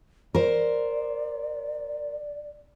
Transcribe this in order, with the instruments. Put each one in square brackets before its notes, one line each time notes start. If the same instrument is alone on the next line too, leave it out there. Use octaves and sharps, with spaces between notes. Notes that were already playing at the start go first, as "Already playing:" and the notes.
[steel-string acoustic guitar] A#4 C5 [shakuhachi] D5